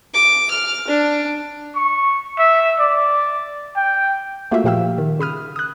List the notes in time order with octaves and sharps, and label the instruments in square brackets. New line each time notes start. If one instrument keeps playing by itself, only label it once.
[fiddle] D6
F6
D4
[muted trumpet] C#6
E5
D5
G5
[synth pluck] A3 A#3 F4 F#4 E5 F5
A#2 F3 G4 F5 G5 E6
D#3
C#3 B5 D#6 F6
D#6 F#6